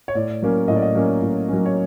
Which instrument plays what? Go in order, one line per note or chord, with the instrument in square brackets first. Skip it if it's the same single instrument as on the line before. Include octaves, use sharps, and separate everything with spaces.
[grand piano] C#5
A2 D5
F#3 A#3 C#4
A2 D#5
D5
D#5
F#3 A#3 C#4
A2
F#3 A#3 C#4
C#5